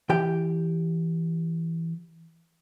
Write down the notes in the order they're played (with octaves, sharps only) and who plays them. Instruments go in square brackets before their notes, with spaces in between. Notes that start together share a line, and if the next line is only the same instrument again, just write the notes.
[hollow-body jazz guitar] E3 G4 G5